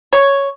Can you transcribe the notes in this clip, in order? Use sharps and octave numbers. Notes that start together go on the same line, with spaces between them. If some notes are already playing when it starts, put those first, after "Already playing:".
C#5